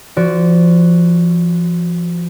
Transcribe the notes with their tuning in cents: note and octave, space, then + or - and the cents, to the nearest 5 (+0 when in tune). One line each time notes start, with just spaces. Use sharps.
F3 -25 F#4 +0 D5 -15